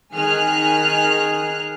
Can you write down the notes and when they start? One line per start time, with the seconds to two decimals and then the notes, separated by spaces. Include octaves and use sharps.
0.13 D#3 G#4 F6 F#6